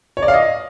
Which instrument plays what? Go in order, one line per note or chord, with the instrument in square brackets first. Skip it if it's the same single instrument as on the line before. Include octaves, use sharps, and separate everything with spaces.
[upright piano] C#5
D5
F5
D#5